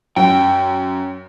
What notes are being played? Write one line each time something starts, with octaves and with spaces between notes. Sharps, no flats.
F#2 G5